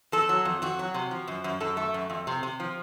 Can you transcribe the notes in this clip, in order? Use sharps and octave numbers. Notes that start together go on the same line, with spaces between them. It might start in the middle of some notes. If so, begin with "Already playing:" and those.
F2 A4
F#3
F2
F2 F#4
F#3
C3
F3
F#2
F#2
F#2 A4
A3
F#2
F2
C3
C3
F3